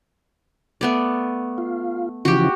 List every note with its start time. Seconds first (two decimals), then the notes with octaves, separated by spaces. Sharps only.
0.81 A3 B3 D5
1.58 F4
2.25 C#3 E3 F3 F#4 G4